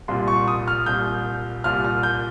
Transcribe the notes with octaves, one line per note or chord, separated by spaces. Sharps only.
C2 A#2 C6
C#6
D#6
F6
C2 A#2 G6
C2 A#2 F6
F6
G6